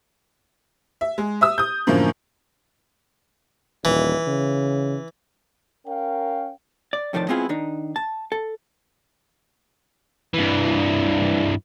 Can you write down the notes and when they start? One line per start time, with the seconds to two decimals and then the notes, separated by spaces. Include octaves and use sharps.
1.01 E5
1.18 G#3
1.41 E5 D#6 E6
1.58 D#6 G6
1.87 F#2 A2 D3 F3 A#3
3.85 D#1 E3
4.27 C#3
5.87 C#4 A#4 F5 G5
6.93 D5
7.13 F2 A2 D#3 F3 D5 A5
7.29 G#3 B3 C4 E4 F4 G#4
7.49 D#3 D4 D#4
7.96 A5
8.32 A4
10.34 G2 E3